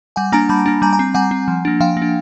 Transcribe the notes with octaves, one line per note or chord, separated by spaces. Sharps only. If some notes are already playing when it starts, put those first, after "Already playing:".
G3 F#5 G#5
A#3 D4 G#5 A#5
G3 A5 B5
A#3 D4
G3 G#5 A#5
G#5 A#5
C4
G3 F#5 G#5
C4
F3
A#3 D4
F3 F5 G5
A#3
D4